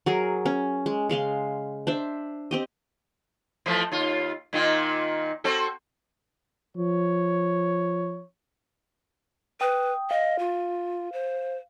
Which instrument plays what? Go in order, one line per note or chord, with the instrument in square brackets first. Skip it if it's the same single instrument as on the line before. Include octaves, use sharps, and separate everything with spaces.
[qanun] F#3 G#4 A#4
C#4
G#3
C#3 G#3 F5 C6
D4 C5 E5
C4 G4 D#5
[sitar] E3 F3 A3
D#2 F4
A#2 D#3 F4
C4 F#4 A4
[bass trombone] F3 [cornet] C#5
[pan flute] B4 [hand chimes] G5 D#6
[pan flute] D#5 [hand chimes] F5
[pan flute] F4
C5